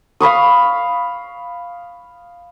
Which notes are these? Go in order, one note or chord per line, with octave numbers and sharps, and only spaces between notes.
F5 B5 C#6 D#6